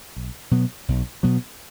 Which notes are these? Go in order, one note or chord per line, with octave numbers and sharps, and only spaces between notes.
B1
B2 F#3 B3
B1
B2 F#3 B3